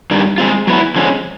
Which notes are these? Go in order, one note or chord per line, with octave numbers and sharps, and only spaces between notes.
G2 D#3 G3
G#3 C4 F4
F#3 B3 E4
D3 F3 G#3 C#4